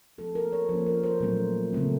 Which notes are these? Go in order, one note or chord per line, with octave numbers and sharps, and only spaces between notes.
F3 A3 C4 A4
A#4
C#5
F3 A#3 C#4 C5
A#4
C5
A#2 F#3 A3 C#4
C#3 A3 C4